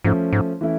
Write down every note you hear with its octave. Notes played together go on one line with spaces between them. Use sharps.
G#2 F3 A3 C#4
G#2
E3 A3 C#4 E4